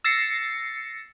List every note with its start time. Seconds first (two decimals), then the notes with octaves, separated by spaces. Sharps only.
0.04 E6 A6 A#6 C7 C#7